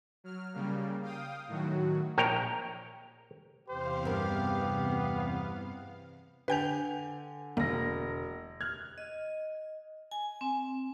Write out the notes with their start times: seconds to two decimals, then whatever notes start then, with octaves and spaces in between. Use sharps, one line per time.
0.24 F#3 F6
0.54 C#3 G3 A#3
1.03 F5 G5 D#6
1.48 A2 D#3 F#3 F#4
2.18 A#1 A#4 C#5 G5
3.69 E2 C3 G4 C5 F5
4.05 G2 B3 A#4
6.48 D3 B4 G5 G#5 G6 F7
7.57 E1 D3 A#3 A#6
8.61 F6 F#6 G#6
8.98 D#5
10.11 G#5
10.41 C4